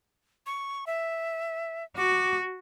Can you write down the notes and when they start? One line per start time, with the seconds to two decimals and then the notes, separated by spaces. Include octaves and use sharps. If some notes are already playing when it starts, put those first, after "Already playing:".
0.46 C#6
0.87 E5
1.97 F#4 D6